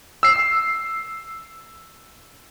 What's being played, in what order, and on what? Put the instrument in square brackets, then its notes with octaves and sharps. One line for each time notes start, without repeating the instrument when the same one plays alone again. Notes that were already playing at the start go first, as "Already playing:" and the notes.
[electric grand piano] E6 C7